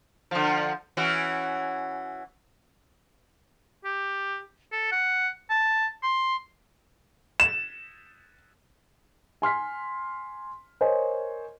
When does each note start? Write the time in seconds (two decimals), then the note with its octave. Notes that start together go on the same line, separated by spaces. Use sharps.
0.31 D3 F3
0.97 E3 C#4 F#4
3.85 G4
4.73 A4
4.92 F#5
5.50 A5
6.03 C6
7.40 E7
9.42 G#5 C6 F6 B6
10.81 A#4 C5 C#5 D#5 G#5